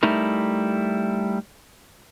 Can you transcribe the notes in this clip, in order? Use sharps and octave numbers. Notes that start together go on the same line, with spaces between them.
G3 A3 D#4 E4 A#4